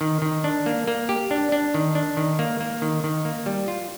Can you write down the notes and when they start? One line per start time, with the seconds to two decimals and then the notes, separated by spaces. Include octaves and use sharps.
0.01 D#3
0.22 D#3
0.44 D4
0.66 A#3
0.87 A#3
1.09 G4
1.31 D4
1.52 D4
1.74 D#3
1.95 D4
2.17 D#3
2.39 A#3
2.61 A#3
2.82 D#3
3.04 D#3
3.25 A#3
3.46 G3
3.68 F4